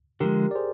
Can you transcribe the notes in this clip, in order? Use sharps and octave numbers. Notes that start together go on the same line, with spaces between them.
D3 F3 G#3 G4 A#4
D5
G#4 C5